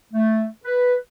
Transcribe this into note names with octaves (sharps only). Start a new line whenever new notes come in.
A3
B4